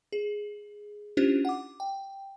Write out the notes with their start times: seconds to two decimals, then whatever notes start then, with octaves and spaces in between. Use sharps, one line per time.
0.12 G#4
1.17 C#4 D4 E4 F4 G4 C5
1.45 F#5 D6
1.80 G5